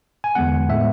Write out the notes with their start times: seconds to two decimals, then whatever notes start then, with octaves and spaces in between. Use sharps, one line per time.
0.24 G#5
0.35 E2 D3 G#3 B3 F#5
0.69 A2 G#3 B3 E5